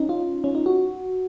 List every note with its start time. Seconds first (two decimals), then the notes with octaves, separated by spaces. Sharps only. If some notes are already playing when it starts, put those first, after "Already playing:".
Already playing: C#4 D#4
0.09 F4
0.44 C#4
0.55 D#4
0.66 F#4